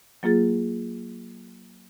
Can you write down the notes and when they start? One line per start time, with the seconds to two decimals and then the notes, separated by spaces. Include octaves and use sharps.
0.23 F#3 A#3 F4 G#4 A6